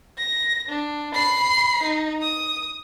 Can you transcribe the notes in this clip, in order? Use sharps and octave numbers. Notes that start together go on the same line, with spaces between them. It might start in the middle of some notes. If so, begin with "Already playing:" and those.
A#6
D4
B5 C7
D#4
D#6